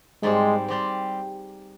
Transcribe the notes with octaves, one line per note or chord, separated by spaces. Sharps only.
G#2 G3 G#3 C4 G4 C5
G3 C4 G4 C5